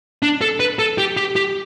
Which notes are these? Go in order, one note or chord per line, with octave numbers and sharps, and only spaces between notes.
D4
A4
B4
A4
G4
G4
G4